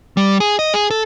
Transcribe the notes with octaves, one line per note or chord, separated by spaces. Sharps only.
G3
G#4
D#5
G#4
A4